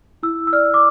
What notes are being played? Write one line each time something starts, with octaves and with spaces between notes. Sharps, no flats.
E4 E6
E6
D5 F6
D6